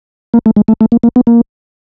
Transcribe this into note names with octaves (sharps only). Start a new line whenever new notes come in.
A#3
A3
G#3
A3
A3
A#3
A#3
B3
A#3